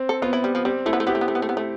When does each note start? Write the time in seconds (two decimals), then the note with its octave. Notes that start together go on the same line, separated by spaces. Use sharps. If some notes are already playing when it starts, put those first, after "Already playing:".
Already playing: C4
0.09 A4
0.22 B3 F4
0.33 E4
0.44 G3
0.55 F3
0.65 G3 C4
0.86 A3 E4
0.93 B3
1.00 A3
1.07 B3 G4
1.15 A3
1.21 B3
1.28 A3
1.35 B3
1.42 A3
1.49 B3
1.57 A3